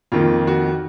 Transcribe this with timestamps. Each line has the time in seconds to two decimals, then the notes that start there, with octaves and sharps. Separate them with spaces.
0.12 F2 D#3 A#3 F4
0.47 F#4